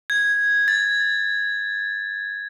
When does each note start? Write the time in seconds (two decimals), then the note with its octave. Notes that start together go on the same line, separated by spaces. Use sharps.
0.10 G#6
0.68 A6